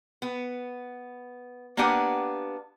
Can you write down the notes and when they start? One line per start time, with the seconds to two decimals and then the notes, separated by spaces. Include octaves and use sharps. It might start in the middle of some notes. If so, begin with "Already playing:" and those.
0.22 B3
1.77 A#3 B3 D4 G4 F#5 G#5